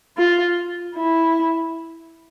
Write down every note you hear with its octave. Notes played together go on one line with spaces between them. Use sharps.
F4
E4